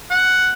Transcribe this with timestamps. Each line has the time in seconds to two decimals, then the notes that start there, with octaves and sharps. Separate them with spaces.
0.11 F#5